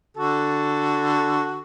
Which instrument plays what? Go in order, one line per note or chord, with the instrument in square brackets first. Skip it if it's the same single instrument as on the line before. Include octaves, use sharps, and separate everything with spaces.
[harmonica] D3 F#4 A4